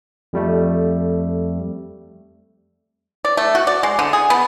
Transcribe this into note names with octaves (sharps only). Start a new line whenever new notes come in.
F2 G3 A3
D5
A3
F#4
D5
G#3
D3
G#4
B3